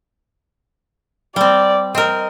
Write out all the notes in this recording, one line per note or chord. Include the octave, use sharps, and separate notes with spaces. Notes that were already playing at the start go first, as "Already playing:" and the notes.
G3 C4 D5
C4 A#4 D#5